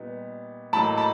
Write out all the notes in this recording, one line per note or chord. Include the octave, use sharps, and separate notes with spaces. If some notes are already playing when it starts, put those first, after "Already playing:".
Already playing: A#2 G3 B3 D#4
A2 F#3 A#3 D#4 A5 B5
A5 B5